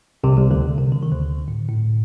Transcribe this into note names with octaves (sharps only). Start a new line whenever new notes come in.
C2 C3
C2 C3
D2 D3
C2 C3
D3
D#3
D2 D3
A2
A2